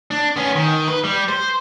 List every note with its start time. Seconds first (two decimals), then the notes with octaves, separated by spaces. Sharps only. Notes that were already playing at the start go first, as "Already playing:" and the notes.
0.11 D4
0.36 B3 C#4
0.56 D#3
0.88 B4
1.04 G3
1.28 C5